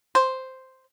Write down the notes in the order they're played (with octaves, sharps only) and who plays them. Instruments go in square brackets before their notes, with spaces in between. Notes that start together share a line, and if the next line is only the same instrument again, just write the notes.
[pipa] C5